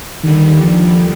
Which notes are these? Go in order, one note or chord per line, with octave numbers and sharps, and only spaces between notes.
D#2 D3 D#3 G3
F3